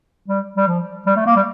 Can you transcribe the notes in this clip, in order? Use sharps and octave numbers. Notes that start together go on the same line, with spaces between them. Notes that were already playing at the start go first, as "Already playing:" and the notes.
G3
G3
F3
G3
A3
A#3
G3